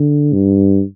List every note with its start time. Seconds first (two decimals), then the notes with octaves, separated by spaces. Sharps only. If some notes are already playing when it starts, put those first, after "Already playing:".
Already playing: D3
0.33 G2